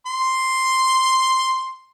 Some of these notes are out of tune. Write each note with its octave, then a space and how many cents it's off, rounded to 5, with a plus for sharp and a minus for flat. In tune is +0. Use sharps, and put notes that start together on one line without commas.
C6 +0